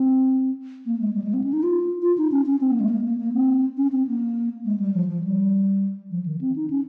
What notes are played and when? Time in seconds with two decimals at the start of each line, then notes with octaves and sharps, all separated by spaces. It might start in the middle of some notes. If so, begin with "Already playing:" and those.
Already playing: C4
0.86 A#3
1.00 G#3
1.15 G3
1.24 G#3
1.34 C4
1.44 C#4
1.53 D#4
1.63 F4
2.02 F4
2.18 D#4
2.32 C#4
2.46 C#4
2.61 C4
2.71 A#3
2.80 G#3
2.89 A#3
3.05 A#3
3.20 A#3
3.34 C4
3.77 C#4
3.92 C4
4.08 A#3
4.65 G#3
4.80 G3
4.94 F3
5.09 F3
5.24 G3
6.11 F3
6.26 D#3
6.41 C4
6.56 D#4
6.70 C#4